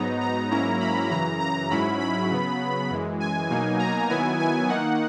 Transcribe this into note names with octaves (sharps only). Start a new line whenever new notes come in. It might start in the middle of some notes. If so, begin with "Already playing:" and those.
Already playing: G#2 F#3 B3 D#4 A#5
A#5
G#2 F#3 A#3 C#4 E4 A#5
B5
F#2 C#3 E3 A#5
A#5
G#2 F#3 C#4 E4 B5
B5
C#3 F#3 B3
F#2 E3 G#3
G#5
B2 F#3 A#3 D#4 G#5
A#5
D#3 F#3 B3 E4 G#5
G#5
D#3 A#3 D#4 F#5